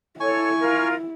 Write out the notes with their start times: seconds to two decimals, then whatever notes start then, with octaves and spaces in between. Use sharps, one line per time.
0.20 E4 A4 C#5 G#5 C#6
0.60 F4 A#4